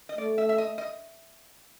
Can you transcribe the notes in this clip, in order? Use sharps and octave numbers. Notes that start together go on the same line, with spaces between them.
D#5
A3 D5
E5
E5
D#5
D#5